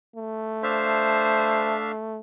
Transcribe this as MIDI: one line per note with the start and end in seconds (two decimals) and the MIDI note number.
0.16 2.20 57
0.63 1.92 62
0.63 1.75 72
0.63 1.92 76
0.63 1.92 77